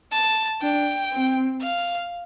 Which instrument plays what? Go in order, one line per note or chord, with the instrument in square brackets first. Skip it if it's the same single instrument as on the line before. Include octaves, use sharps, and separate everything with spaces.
[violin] A5
[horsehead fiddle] D4 [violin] G5
[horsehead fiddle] C4
[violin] F5